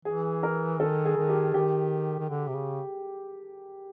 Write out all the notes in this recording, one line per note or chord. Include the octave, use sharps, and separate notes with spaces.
E3 G#4
A#4
D#3 A4
G#4
D#3
G4
D#3 G4
D#3
D3
C3
C#3